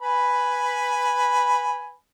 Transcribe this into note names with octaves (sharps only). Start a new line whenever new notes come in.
B4 G#5 B5